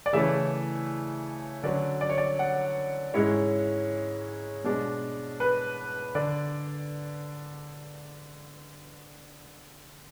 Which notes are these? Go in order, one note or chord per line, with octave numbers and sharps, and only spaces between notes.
D5
C#3 E3 A3 C#4 E4 E5
D3 F#3 C#4 D5
D5
C#5
D5
F#5
G#2 G#3 C#4 E4 C#5
B2 G#3 D4
B4
D3 D5